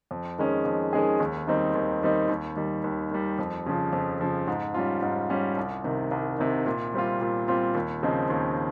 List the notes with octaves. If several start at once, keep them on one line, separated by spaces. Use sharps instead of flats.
F2
D#3 G#3 C#4 G#4
F2
D#3 G#3 C#4 G#4
D#2
D#3 G3 C4 D#4
D#2
D#3 G3 C4 D#4
D#2
D#3 G3
D#2
D#3 G3
F2
C#3 F3
F2
C#3 F3
G#2
G3 C#4 F4
G#2
G3 C#4 F4
C2
C3 D#3
C2
C3 D#3
A#2
G3 C4 F4
A#2
G3 C4 F4
D#2
C#3 F3 C4 D#4
D#2